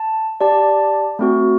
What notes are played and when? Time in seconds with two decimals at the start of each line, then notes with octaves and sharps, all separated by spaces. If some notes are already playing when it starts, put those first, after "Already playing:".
Already playing: A5
0.41 G4 D5 A5
1.19 A3 C4 F#4